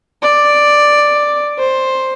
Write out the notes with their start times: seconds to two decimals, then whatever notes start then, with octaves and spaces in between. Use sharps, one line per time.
0.22 D5
1.58 C5